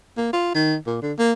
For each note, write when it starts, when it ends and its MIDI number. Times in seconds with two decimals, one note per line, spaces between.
0.17 0.31 58
0.33 0.55 65
0.55 0.76 51
0.87 1.00 46
1.02 1.13 50
1.19 1.32 58